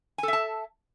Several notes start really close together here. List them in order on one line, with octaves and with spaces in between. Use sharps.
G#5 A4 E5 A5